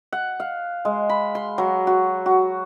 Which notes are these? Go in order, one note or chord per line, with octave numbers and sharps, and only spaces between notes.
F#5
F5
G#3
B5
C6
F#3
F#4
F#4